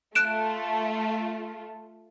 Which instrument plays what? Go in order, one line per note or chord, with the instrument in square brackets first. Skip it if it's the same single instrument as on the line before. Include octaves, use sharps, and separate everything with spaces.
[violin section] A3 F4 [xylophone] F#6 D7 E7